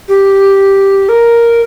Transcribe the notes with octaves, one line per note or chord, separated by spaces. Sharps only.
G4
A#4